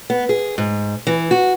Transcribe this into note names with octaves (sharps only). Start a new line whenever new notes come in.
B3
G#4
G#2
E3
F#4